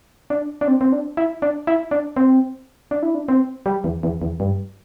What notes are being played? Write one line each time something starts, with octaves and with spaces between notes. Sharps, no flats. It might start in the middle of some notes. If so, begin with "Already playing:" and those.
D4
D4
C4
C4
D4
E4
D4
E4
D4
C4
D4
E4
D4
C4
G3
E2
E2
E2
G2